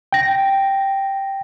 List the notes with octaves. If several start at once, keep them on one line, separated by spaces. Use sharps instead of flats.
G5 A#6